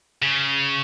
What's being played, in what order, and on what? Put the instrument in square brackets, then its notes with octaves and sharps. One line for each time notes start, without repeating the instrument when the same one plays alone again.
[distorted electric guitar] C#3